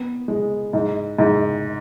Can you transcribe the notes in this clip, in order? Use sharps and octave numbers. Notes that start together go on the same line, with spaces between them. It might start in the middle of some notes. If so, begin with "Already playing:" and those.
Already playing: B3
G#3
G#2
G#2